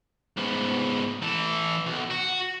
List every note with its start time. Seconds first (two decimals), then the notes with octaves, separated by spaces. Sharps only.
0.37 G#2 B3
1.22 E3 A4
1.87 B1
2.11 F#4